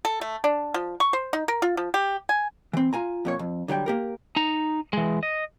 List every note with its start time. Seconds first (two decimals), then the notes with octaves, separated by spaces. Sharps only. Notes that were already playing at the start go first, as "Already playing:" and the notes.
0.05 A4
0.21 A3
0.44 D4
0.74 F3
1.00 C#6
1.13 C5
1.33 D#4
1.48 A#4
1.62 F4
1.77 F3
1.94 G4
2.29 G#5
2.73 E3 C4
2.93 F4 G#5 A#5
3.25 F2 A#2 C#5
3.39 F2
3.68 D3 F#3 G3 G5
3.86 A#3 G4 A#4
4.36 D#4 A#5
4.93 E3 G#3
5.23 D#5